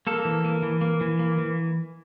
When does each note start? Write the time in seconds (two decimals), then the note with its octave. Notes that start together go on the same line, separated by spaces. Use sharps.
0.07 A#3 A4
0.25 E3
0.44 A#3
0.63 E3
0.81 A#3
1.01 E3
1.19 A#3
1.38 E3